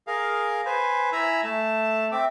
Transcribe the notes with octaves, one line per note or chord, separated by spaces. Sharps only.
G#4 A#4 F5
B4 C5 G#5
E4 G#5 A#5 B5 E6
A3 A5
C4 E5 D6